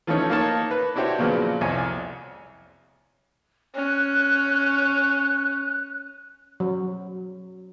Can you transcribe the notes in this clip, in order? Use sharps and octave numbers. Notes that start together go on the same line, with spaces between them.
E3 F3 A3 C#4 D#4 C#5
A#3 D#4 A#4 C#5 A5
B4
D4 E4 F#4 G4 C5 C#5
A#2 C#3 F3 F#3 B3
C2 F2 C#5 G#5
C#4 F#6
F#3